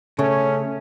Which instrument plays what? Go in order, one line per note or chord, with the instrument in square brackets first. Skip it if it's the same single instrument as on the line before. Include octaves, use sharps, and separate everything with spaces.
[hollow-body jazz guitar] C#3 [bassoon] A3 [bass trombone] C#4